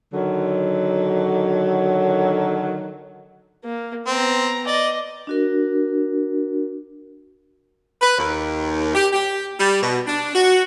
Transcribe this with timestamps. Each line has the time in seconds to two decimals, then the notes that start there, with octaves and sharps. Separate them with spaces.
0.13 D3 D#3 F#3
3.64 A#3
4.07 B3 C4 A#5
4.67 D5 D#5
5.27 D4 F#4 A#4
8.02 B4
8.18 D#2
8.95 G4
9.13 G4
9.58 G3
9.82 B2
10.07 D4
10.35 F#4